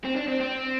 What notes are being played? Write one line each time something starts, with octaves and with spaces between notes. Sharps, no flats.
C4
D4
C4
C4